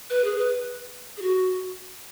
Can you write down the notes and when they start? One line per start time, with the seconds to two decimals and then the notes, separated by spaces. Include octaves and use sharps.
0.10 B4
0.24 G#4
0.38 B4
1.17 G#4
1.22 F#4